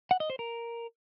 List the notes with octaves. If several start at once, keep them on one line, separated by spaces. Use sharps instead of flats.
F#5
D#5
C5
A#4